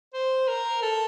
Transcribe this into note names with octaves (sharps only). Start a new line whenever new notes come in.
C5
A#4
A4